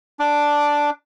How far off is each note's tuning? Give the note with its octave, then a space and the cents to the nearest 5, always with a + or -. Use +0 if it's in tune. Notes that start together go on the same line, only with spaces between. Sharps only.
D4 +0 D6 +0